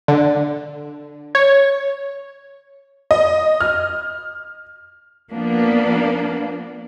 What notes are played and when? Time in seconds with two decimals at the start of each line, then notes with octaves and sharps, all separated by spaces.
0.08 D3
1.35 C#5
3.11 D#5
3.61 F6
5.31 F3 A#3 B3 D4